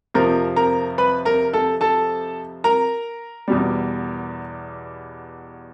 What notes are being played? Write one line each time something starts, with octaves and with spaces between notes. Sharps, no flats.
F2 C3 F3 A#4 A#5
A#4 A#5
B4 B5
A#4 A#5
A4 A5
A4 A5
A#4 A#5
E2 B2 G3